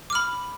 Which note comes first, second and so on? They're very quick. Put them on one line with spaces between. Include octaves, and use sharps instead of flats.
D6 F6 B5